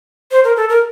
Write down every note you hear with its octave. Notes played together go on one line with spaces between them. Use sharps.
C5
A#4
A4
A#4